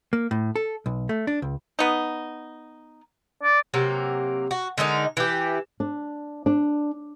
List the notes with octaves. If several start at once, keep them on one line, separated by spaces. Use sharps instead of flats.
A#3
A2
A4
B1
A3
D4
C#2
B3 D#4
D5
C3 F#3 A#3
F#4
D3 G#3 D#4 A#4
E3 G4
D4
D4